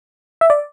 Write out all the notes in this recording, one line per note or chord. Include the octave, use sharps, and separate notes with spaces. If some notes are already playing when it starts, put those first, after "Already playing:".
E5
D5